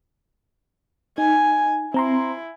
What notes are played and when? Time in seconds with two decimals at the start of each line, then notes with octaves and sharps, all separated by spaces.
1.18 D#4 G#5
1.94 C4 E4 A#5 C6